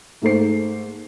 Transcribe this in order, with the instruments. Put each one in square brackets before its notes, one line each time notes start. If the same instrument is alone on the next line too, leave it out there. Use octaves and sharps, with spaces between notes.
[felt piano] G#2 A3 A#3 C5 C7